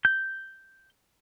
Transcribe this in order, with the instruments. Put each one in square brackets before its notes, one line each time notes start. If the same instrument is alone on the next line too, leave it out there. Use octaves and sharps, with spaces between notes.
[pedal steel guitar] G6